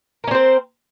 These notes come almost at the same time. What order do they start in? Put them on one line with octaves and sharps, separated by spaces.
A#4 C#4 C4 C5